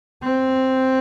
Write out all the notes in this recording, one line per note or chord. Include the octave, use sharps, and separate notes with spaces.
C4